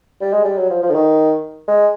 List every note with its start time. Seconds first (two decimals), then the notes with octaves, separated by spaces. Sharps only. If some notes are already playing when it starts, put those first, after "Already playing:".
0.21 G3
0.33 G#3
0.44 G3
0.58 F#3
0.70 F3
0.82 F3
0.90 D3
0.95 D#3
1.68 G#3